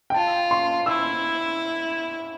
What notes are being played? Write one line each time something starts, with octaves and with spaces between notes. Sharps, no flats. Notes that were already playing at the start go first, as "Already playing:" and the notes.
G5
F4 A5
C6
E4 E6